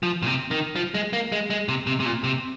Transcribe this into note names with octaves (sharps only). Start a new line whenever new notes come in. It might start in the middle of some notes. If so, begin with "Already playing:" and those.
F3
A#2
C3
D#3
F3
G#3
A#3
G#3
G#3
C3
C3
C3
A#2
C3